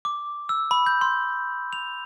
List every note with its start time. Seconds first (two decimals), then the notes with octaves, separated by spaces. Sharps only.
0.05 D6
0.49 E6
0.71 B5
0.86 G6
1.01 C6
1.73 F7